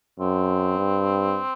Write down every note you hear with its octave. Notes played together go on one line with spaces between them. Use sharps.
F#2 C4
G2